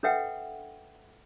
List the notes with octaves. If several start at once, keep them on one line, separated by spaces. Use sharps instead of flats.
D4 A4 B4 E5 F#5 G5